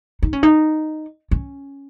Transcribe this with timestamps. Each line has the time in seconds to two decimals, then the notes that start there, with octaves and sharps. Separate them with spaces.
0.23 D#4
0.33 C#4
0.43 D#4
1.31 C#4